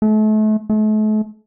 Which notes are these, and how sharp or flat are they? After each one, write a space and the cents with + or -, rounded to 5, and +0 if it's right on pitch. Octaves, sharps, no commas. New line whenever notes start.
A3 -35
A3 -40